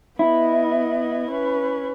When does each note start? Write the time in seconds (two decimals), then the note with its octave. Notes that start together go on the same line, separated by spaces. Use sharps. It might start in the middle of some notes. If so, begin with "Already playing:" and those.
0.19 B3 E4 D#5
1.31 C#4 B4